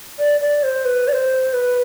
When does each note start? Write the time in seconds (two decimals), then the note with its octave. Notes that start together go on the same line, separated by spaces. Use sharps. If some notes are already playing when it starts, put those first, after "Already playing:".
0.19 D5
0.41 D5
0.63 C5
0.85 B4
1.08 D5
1.13 C5
1.53 B4